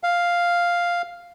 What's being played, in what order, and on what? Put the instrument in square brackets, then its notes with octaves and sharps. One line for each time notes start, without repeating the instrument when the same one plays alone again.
[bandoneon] F5